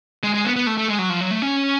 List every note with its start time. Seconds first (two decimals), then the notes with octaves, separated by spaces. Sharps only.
0.23 G#3
0.34 G#3
0.45 B3
0.56 B3
0.67 A3
0.78 A3
0.88 G#3
0.99 F#3
1.10 F3
1.21 F#3
1.31 A3
1.42 C#4